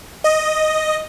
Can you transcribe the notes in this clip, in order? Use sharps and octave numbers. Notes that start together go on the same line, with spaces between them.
D#5